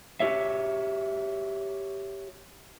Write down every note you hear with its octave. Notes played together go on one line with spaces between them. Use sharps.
F#4 G4 C#5 E5